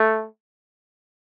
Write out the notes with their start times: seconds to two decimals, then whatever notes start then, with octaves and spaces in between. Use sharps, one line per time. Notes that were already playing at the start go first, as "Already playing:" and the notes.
Already playing: A3